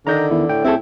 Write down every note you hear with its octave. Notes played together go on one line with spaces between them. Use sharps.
D3 D#3 A#5 G6 A#6
E2 D#3 E4
A2 G5
C4 E4 G#4 A4